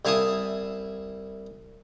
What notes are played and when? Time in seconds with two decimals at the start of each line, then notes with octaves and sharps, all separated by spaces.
0.05 C2 E4 F5 G#5 A5 D#6